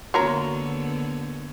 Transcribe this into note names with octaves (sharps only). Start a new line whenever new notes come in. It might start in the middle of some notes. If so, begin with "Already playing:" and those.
D3 A#3 B3 F4 F#4 A#4 C#5 A#5